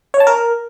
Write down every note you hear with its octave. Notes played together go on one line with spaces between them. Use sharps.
C#5
A5
A#4